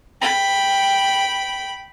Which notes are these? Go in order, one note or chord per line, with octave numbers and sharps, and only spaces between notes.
G5 B5